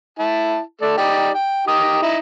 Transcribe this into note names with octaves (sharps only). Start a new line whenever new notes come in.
E4 A5
A3 A4 D5
D#4 G4 D5
G5
D#4 G4 D#6
D#4 E4